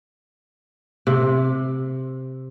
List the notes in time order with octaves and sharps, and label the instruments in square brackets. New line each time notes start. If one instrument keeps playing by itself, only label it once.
[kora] C3